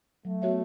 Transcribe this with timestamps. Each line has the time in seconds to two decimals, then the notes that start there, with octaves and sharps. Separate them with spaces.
0.25 F#3 A3
0.42 B3 F#4 C#5 E5